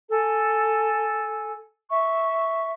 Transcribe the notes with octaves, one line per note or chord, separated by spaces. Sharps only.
A4 G#5
E5 C#6